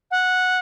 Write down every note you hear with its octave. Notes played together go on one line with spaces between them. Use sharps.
F#5